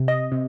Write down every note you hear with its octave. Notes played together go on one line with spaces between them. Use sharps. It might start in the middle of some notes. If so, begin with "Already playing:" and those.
Already playing: C3
D#5
C3